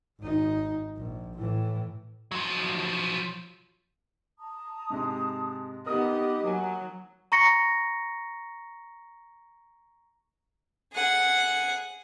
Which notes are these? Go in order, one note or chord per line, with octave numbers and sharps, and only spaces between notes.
G#1 D#4
A#1
A2 E3
F3 F#3
A5 A#5 D#6
G#2 C3 G#3
B3 D#4 G4 A#4 D#5 D#6
F#3 A#3 G#5
A#5 C#6 A#6 C#7
G#4 F#5